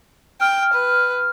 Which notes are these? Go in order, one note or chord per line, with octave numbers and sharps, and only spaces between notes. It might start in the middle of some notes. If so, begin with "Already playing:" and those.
G5 F6
B4